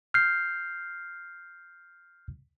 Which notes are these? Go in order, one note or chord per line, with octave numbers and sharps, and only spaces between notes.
F6 G6 C7